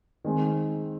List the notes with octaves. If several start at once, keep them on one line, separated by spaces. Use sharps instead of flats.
D#3 G#3 C4